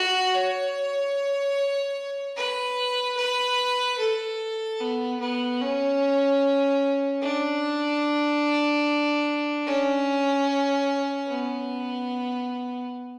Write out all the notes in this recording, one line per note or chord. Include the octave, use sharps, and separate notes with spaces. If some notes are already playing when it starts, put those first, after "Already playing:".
Already playing: F#4
C#5
B4
B4
A4
B3
B3
C#4
D4
C#4
B3